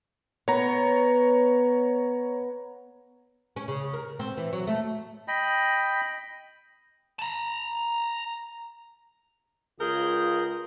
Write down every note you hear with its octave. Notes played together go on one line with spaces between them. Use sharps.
B3 C#5 A#5
C#4
C#3
A#4
C4
E3
F#3
A3
D#5 G5 B5
A5 A#5
C#2 G#3 F4 G#4 A#4 G6